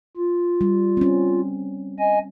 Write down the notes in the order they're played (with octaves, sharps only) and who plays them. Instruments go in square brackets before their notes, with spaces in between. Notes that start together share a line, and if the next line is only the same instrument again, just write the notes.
[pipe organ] F4
[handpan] G3
C4 C#4
[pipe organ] D#5 G#5